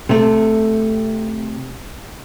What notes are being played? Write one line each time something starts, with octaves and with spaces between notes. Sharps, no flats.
C3 A3